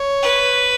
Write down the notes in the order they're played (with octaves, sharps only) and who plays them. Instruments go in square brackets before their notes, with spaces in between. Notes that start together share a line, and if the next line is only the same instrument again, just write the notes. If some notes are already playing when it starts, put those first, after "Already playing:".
Already playing: [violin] C#5
[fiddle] B4